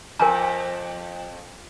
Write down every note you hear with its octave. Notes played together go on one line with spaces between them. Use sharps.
F2 A#4 G#5 A#5